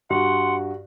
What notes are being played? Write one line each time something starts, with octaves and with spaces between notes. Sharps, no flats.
G2 F#4 F#5 C6